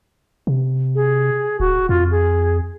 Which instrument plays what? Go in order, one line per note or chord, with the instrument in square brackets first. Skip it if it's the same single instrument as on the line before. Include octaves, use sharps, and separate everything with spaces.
[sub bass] C3
[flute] G#4
[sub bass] D1 [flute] F#4
[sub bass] F2 [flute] F4
[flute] G#4